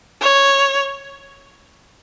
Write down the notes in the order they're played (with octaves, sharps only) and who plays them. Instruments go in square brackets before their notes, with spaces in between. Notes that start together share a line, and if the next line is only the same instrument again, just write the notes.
[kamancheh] C#5